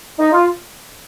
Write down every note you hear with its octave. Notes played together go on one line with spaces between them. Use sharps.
D#4
F4